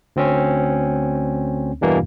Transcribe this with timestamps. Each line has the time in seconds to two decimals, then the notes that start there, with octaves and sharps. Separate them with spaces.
0.16 D2 C4 C#4
1.81 E2 G2 B2 E3 A#3